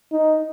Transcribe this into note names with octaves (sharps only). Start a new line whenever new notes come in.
D#4